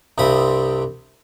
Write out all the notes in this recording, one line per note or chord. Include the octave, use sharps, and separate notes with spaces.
C2 G2 C3 C4 B5 D#6